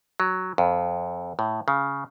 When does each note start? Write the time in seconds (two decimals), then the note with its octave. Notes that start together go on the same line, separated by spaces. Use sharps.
0.20 F#3
0.58 F2
1.39 A2
1.68 C#3